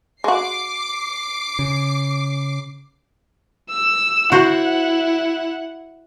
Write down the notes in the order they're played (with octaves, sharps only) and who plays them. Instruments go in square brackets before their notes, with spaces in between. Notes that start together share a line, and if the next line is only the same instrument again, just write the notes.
[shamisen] G#3 F#4 [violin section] D6 C7
[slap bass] C#3
[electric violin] E6
[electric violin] E4 F#5 [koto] F#4 C5